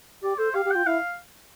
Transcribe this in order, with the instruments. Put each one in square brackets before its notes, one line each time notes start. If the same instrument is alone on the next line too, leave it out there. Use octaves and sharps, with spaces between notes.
[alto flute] G4 [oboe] D5
[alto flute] A4 [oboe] C5
[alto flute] G4 [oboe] F5
[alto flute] G4
[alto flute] F4 [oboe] G5
[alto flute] E4 [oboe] F5